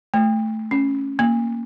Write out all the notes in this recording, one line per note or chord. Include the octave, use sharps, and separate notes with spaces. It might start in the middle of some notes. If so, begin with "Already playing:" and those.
A3
C#4
A#3